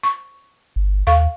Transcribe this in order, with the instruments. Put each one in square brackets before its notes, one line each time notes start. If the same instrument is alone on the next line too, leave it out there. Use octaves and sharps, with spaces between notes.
[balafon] C#6
[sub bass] G1
[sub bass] D#2 [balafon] A4 F5 C#6